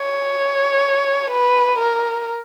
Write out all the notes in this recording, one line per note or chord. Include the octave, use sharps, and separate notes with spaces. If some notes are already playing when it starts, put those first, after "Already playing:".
Already playing: C#5
B4
A#4